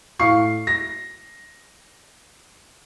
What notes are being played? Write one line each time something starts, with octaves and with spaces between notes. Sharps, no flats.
A2 F5 C#6 C7
A#6